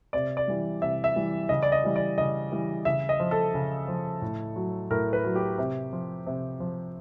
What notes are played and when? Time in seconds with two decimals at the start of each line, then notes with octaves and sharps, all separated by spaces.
0.13 C3 D5
0.37 D5
0.48 E3 G3
0.81 C3 E5
1.04 E5
1.16 E3 G3
1.49 C#3 D#5
1.63 D5
1.72 D#5
1.84 E3 G3
1.96 D5
2.18 C#3 D#5
2.52 E3 G3
2.85 C#3 E5
3.09 D#5
3.20 F3
3.31 A4
3.54 C#3
3.88 F3
4.22 A2
4.56 F#3
4.90 A2 A#4
5.13 B4
5.24 F#3
5.35 G4
5.58 C3
5.93 F3
6.26 C3
6.60 F3